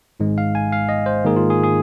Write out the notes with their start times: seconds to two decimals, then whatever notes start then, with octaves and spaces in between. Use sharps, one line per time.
0.20 G#1 G#2 G#3
0.38 F5
0.55 G#5
0.72 F5
0.89 D#5
1.06 C5
1.24 G#2 D#3 A#3 D#4 G#4
1.36 F4
1.50 G#4
1.64 G#4